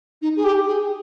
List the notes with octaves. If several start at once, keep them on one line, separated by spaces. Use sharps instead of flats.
D#4
G#4
G4
G#4